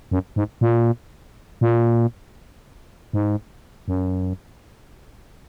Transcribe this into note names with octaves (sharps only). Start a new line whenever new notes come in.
F#2
G#2
A#2
A#2
G#2
F#2